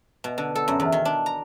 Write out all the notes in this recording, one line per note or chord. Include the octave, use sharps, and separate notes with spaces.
B2
D3
A4
F#2
E2
D#3
D4
A#5